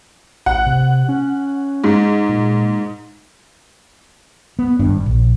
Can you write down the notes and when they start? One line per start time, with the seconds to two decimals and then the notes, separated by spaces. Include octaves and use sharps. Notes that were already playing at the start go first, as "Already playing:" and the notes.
0.46 A1 F#5
0.67 C3
1.09 C#4
1.84 G#2
2.29 A#2
4.59 B3
4.79 G#1 G2 D4
5.06 A#1